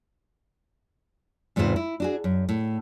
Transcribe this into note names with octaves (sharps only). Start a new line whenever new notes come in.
E2 G#2 C3 F4 B4 C5
E4
D4 F#4 G#4
F#2
A2